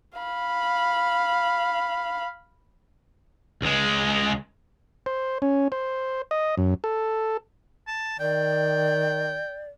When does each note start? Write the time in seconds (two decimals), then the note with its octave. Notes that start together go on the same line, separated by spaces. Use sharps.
0.18 F5 B5
3.62 C#2 G#3
5.06 C5
5.42 C#4
5.72 C5
6.31 D#5
6.58 F#2
6.84 A4
7.87 A5
8.20 D#3 D5 G5